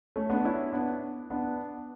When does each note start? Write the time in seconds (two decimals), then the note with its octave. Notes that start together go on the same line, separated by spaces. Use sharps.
0.16 A3 C#4
0.30 B3 D4
0.45 C#4 E4
0.73 B3 D4
1.30 B3 D4